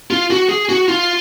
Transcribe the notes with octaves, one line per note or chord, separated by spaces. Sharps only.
F4
F#4
G#4
F#4
F4